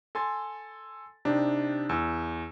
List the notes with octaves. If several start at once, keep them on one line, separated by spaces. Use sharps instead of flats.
A4 G#5 C6 A6
C3 D4 D#4 G4
E2 E6